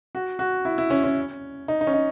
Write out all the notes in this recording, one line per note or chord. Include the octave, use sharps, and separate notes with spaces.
F#4
F#4
E4
E4
C#4
C#4
D#4
D#4
C#4
D#4